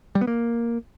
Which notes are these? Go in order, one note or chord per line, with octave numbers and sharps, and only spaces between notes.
G3
B3
A#3